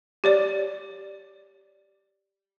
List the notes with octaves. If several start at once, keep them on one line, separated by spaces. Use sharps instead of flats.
G4 C#5 D5